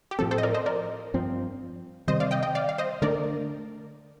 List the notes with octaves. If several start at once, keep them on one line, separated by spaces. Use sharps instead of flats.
G4
A2 F3 C4 A4
A4 C5
D#5
A#4 D5
C5 D#5
A#4 D5
G2 F3 C4
C3 D#3 G3 C4 C5 D#5
D5 F5
D#5 G5
D#5 G5
D5 F5
F5
C5 D#5
D3 A3 D4 A#4 D5